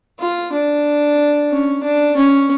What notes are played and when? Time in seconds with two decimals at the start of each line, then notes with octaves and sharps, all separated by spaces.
0.20 F4
0.53 D4
1.51 C#4
1.84 D4
2.17 C#4